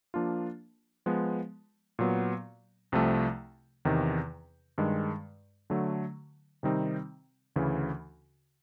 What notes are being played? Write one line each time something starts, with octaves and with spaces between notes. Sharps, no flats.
F3 A#3 D4 F4
F3 G#3 B3
A#2 F#3 B3
C2 C3 F3 A3
E2 C3 D#3
G2 D#3 G#3
D3 F#3 A3
C3 D#3 G3 C4 D#4
D2 C#3 E3